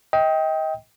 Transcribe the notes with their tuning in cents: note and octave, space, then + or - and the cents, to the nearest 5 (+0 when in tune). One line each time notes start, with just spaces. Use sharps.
D#5 +30 G5 +0